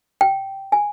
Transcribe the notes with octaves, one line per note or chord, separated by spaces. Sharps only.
G5
G#5